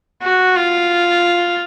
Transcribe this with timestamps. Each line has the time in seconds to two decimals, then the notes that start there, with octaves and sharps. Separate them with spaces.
0.23 F#4
0.57 F4